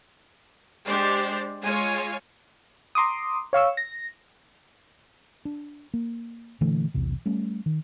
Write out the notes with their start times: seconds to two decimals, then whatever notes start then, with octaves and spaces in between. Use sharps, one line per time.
0.87 G#3 D4 G4 C5 D5
1.64 G#3 F4 C#5 G#5
2.95 A#5 C6 D6 D#6
3.53 C#5 F5 C#6 E6
3.77 A#6
5.45 D4
5.94 A#3
6.61 A#2 D3 E3 A3
6.94 B1 E2 C3
7.26 G3 A3 C#4
7.66 D#3